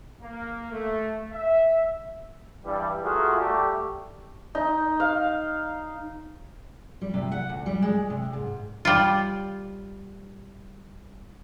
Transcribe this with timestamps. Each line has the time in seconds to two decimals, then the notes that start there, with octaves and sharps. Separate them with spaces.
0.21 A#3
0.70 A3
1.31 E5
2.65 G2 E3 G3
3.03 A3 F4 F#4 G#4 A#4
3.37 G3 A3 G4
4.55 D#4
5.00 F5
7.01 G3
7.14 C3
7.32 F#5
7.49 D2
7.66 G3
7.82 G#3
8.10 C3
8.33 G#2
8.85 G3 F4